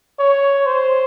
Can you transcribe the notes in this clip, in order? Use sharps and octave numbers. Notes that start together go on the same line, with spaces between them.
C#5
C5